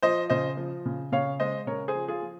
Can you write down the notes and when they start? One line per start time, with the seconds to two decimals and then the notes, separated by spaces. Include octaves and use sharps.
0.03 F3 C5 D#5
0.30 C#3 C5 D#5
0.57 F3
0.86 C#3
1.12 C#3 C#5 F5
1.40 G#3 C5 D#5
1.67 C#3 A#4 C#5
1.88 G#4 C5
1.95 F3
2.08 F4 G#4
2.22 F3